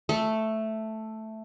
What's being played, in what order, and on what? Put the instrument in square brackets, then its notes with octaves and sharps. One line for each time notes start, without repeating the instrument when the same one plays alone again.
[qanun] A3